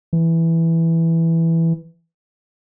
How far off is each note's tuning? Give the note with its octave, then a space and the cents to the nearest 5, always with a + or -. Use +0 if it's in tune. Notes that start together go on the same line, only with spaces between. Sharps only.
E3 +0